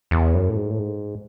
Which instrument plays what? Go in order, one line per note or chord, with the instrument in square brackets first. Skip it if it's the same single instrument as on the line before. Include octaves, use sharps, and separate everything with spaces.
[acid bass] E2
F#2
A2
G#2
A2
G#2